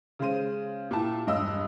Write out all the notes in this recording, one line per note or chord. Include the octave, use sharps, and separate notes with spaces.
C#3 G#3 C5 D#7
A#2 E4 G4 A5
E1 G2 D#5 E6